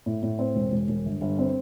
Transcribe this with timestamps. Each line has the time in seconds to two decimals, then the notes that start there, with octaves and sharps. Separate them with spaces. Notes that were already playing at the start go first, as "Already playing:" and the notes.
0.06 A2
0.23 A2
0.39 C4
0.55 E1
0.71 E1
0.88 E1
1.06 G1
1.21 G1
1.38 C4